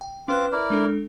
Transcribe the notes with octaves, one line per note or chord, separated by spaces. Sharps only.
G5
C4 C#4 F4 B4 D6 F#6
E4 A#4 D5
G#3 D4 A4